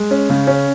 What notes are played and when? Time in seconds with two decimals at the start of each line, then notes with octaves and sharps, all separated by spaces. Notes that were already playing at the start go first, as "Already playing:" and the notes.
Already playing: G#3
0.11 C#4
0.30 C#3
0.47 C#4